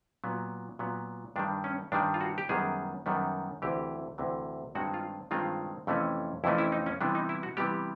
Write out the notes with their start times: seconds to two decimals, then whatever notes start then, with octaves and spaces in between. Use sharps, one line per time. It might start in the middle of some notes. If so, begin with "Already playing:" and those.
0.24 A#2 F#3 B3
0.79 A#2 F#3 B3
1.36 G2 D#3 G3 D4
1.64 C#4
1.92 G2 D#3 G3 D4
2.14 F4
2.21 F#4
2.38 G4
2.49 F#2 D#3 G3 B3 G#4
3.06 F#2 D#3 G3 B3
3.62 D2 C3 E3 G4
4.18 D2 C3 E3
4.75 G2 D#3 G#3 C4 F#4
4.94 F4
5.31 G2 D#3 G#3 C4 F4
5.87 F2 C3 E3 A3 C#4
6.44 F2 C3 E3 A3 C#4 E4
6.58 E4
6.72 D#4
6.86 C#4
7.01 C3 E3 G3 B3 D4
7.15 D#4
7.29 E4
7.43 F#4
7.57 C3 E3 G3 B3 G4